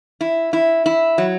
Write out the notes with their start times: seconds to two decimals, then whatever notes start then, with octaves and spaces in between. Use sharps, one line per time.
0.21 E4
0.53 E4
0.86 E4
1.18 F#3